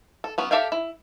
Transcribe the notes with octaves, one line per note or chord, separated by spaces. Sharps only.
A4
F#3 B3 C#4
G4 A4 E5 F5 G5
E4